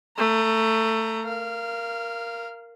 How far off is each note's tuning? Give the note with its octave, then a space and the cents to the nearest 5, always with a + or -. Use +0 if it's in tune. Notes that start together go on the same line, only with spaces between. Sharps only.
A3 +20 A#5 +0
A#4 +0 F5 -20